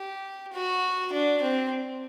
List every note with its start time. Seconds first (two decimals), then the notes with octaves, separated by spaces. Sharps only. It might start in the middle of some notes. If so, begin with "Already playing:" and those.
Already playing: G4
0.53 F#4
1.12 D4
1.42 C4